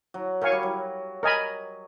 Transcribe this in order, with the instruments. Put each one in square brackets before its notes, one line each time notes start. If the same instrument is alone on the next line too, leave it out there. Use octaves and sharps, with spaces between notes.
[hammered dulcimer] F#3
[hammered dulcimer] F#3 [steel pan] A#4 C#5 F5 G#5 C#6
[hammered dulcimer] G3
F#3
[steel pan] A#4 D#5 G#5 B5